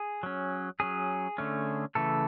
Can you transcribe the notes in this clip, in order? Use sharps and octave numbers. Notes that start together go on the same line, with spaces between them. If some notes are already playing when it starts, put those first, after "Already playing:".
Already playing: G#4
F#3 C#4
F#3 C#4 G#4
D3 A3 C#4
C#3 E3 A3 A4